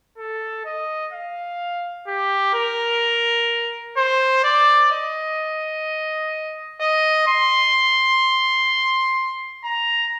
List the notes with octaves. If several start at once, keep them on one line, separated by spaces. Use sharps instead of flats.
A4
D#5
F5
G4
A#4
C5
D5
D#5
D#5
C6
A#5